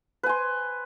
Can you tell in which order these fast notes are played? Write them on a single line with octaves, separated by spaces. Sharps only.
B4 G#5 C6